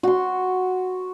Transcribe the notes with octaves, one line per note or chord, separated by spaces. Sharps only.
F#4 C6